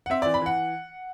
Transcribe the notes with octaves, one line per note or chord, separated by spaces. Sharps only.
F#5
C4 E5
E3 D5
B5
E3 F#5